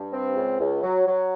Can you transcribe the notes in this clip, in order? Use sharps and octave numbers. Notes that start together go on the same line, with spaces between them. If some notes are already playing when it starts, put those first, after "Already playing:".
Already playing: G2
C4
C#2
C#2
F#3
F#3